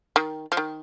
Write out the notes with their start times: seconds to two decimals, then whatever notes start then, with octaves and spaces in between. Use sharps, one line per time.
0.16 D#3
0.52 F3
0.57 D#3